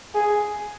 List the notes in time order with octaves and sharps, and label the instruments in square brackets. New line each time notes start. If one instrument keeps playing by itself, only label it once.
[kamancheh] G#4